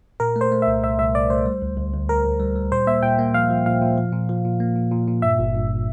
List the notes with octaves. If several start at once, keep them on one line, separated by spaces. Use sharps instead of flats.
A#2 A#4
A3
C5
A3
C2 E5
C2 E5
C2 E5
C2 D5
A3 C5
G3
D2
D2
D2
D2 A#4
D2
G3
G3
A#2 C5
A#3 E5
A#2 G5
A#3
F3 F5
F3
A#2 F5
A#2
F3
A#2
F3
A#2
A#3
A#2
A#2
A#2
G2 E5
G1
G2